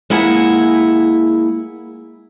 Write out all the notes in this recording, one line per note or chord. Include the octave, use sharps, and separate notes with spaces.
G#3 A#3 E4 G#4 F#5 G#5